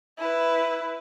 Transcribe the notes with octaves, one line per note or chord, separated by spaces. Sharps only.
E4 B4